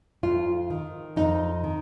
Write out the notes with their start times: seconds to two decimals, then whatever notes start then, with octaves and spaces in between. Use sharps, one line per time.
0.23 F2 F4
0.70 D#3
1.16 F2 D#4
1.64 D#3